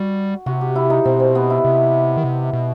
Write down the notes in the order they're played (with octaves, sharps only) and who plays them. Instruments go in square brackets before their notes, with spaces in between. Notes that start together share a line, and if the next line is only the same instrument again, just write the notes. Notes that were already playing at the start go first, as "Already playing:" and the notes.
Already playing: [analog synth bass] G3 [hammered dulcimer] F#4
[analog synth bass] C3 [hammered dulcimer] F#4
[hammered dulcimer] G4
E4
D#4
[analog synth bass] B2 [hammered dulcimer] C4
[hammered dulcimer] C4
B3
E4
[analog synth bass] C3
D#3
C3
B2